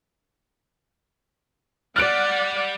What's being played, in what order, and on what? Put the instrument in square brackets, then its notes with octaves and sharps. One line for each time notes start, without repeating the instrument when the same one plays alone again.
[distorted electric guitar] G3 [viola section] D5 F#5 [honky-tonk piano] F6 F#6 D7